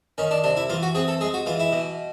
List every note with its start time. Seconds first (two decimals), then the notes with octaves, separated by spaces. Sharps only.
0.18 D#3 C#4
0.31 D4
0.44 C3 D4
0.57 E4
0.69 E3 F4
0.83 F#4
0.95 C4 G#4
1.08 A4
1.21 G#3 G#4
1.34 F#4
1.46 E3 F4
1.59 E4
1.72 B2